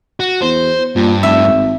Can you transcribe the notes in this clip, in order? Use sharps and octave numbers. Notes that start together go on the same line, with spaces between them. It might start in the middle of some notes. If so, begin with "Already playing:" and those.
F#4
E2 C5
G2 A#2
F1 E5
G#1